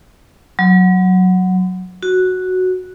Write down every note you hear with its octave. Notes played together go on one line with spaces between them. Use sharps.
F#3
F#4